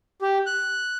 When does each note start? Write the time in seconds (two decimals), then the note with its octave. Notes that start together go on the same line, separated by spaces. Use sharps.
0.22 G4
0.46 F#6